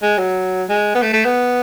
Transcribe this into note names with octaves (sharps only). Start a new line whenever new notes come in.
G#3
F#3
G#3
B3
A3
A3
B3